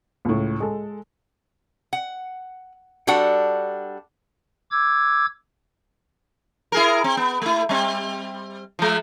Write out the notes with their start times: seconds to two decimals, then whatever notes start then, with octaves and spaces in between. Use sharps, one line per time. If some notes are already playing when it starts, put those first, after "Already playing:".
0.25 C#2 A2
0.60 G#3 A4
1.93 F#5
3.07 G3 D4 F#4 A4 F#5
4.71 D6 E6 G#6
6.72 E4 G#4 A#4
7.04 C4
7.17 B3
7.42 A3 E4
7.69 G3 C4
8.79 F3 G#3